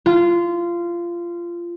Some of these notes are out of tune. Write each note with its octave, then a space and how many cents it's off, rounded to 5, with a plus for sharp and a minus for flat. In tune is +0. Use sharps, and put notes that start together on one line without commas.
F4 -20